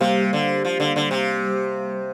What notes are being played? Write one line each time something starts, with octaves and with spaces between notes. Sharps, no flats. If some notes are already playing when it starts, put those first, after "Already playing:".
C3 G3 A#3 G4 C5 F5
D3
F3
D3
D3
C3